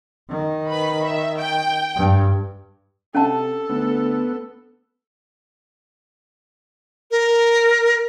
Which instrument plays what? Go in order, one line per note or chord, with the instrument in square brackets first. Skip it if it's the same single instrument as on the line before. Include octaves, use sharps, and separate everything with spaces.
[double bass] D#3
[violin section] B4 B5
E5
G5
[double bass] G2
[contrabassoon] C3 [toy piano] C#4 F#5 A5 [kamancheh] A4
[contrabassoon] D2 [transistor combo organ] B3
[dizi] A#4